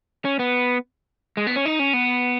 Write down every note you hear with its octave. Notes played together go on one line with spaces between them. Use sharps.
C#4
B3
G#3
B3
C#4
D#4
C#4
B3